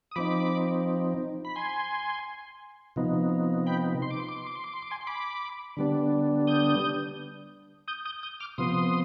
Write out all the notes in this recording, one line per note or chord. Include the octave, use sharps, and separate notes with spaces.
D#6
F3 C4 D#4 B5 D6
B5
G#5 C6
C3 F3 B3 D#4
G5 B5
C6
D6
C6
D6
C6
D6
C6
D6
C6
D6
G#5 C6
C6
B5 D6
D3 G3 B3 D4
D#6 G6
D#6 G6
D#6 G6
D#6 G6
D6 F6
C3 F3 B3 C6 D#6